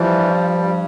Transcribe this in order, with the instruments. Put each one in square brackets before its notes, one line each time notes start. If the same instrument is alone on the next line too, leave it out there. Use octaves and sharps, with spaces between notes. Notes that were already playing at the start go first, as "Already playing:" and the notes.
Already playing: [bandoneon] E3 G3 [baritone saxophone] F3
[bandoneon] G2
G2